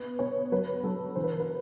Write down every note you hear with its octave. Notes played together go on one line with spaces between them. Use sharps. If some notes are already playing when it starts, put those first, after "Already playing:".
Already playing: B3 B4
B3 C#5
F#3 B4
F#3 A4
E3 C5
B4
A#4
B4